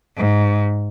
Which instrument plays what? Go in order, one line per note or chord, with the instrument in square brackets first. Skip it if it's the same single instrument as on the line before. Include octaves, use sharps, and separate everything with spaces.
[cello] G#2